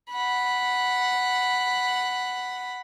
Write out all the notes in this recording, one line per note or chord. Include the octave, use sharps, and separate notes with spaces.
F#5 B5